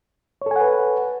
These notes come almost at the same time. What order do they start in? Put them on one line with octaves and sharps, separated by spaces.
C#5 A4 G#5 F#5 B4